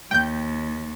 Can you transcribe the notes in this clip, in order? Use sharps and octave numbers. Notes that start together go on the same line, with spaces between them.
D#2 G5 G6